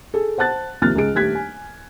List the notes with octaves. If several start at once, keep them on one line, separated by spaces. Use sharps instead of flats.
G#4 A4
C5 F#5 A5 F#6 A6
D#2 C3 F3 F6 F#6 A6
C#2 G#4 D7
D#1 A3 G4 F#6 G#6 B6
G#5